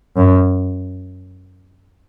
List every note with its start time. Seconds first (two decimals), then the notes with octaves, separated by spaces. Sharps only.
0.17 F#2